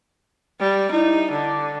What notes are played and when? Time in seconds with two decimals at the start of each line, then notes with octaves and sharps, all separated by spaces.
0.60 G3
0.91 D#4 E4
1.31 D3 D6